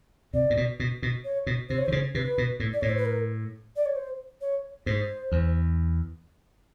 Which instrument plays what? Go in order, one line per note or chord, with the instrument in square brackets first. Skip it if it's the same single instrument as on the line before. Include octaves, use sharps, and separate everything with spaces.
[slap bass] C3 [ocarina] D5
[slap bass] A#2
B2
B2
B2
[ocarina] C#5
[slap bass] B2
[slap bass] C3 [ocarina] C5
[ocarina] C#5
[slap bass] D3 [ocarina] C5
[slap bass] C#3
[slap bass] C3 [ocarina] B4
[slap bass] B2
A2
[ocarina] D5
[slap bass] A2 [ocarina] C#5
[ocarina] C5
B4
A#4
D5
C#5
C5
C#5
[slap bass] G#2 [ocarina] C5
[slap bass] E2